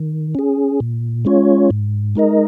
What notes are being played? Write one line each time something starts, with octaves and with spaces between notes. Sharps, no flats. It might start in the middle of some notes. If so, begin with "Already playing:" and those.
Already playing: D#3
C#4 G#4
A#2
G#3 C#4 F4 C#5
G#2
G#3 D#4 A#4 D#5